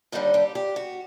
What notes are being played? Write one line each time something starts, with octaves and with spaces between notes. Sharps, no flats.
D#2 D3 G3 D4 D#4
G4
G4
F#4